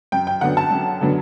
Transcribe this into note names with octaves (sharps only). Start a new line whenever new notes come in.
F#2 G5
G5
D3 F#3 B3 D4 F#5
A5
F#2
D3 F#3 B3 D4